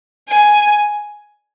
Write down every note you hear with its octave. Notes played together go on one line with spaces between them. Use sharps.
G#5